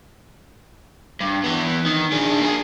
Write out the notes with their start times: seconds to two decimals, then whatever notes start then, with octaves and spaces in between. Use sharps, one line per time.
1.21 G2
1.44 E3 B3
1.86 D#3
2.12 D4 G#4
2.40 A#3 G#4